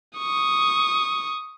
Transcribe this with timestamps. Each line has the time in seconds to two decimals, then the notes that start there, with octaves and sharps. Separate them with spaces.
0.19 C#6 D#6